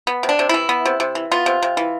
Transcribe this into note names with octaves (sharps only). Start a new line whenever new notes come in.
B3
C3
D4
C3
E3 E4
B3
C3
C3
E3
B3 F4
C3
C3
E3